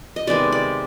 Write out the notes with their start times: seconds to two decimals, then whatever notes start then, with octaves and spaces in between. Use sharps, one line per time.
0.16 D#5
0.27 C3 D#3 G#3 B3 D5
0.52 D5